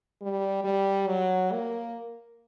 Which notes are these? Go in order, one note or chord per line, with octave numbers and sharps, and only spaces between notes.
G3
G3
F#3
A#3